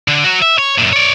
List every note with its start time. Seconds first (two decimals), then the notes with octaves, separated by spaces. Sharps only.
0.08 D3
0.24 F#3 F#4
0.42 E5
0.58 C#5
0.78 F#2 A#2
0.93 C#5 D5